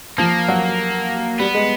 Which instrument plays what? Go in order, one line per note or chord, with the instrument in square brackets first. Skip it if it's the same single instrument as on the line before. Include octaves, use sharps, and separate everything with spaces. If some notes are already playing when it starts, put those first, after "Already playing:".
[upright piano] F3 [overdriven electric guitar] A#3
[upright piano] F#3
[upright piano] G3 [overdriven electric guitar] B3
[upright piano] G#3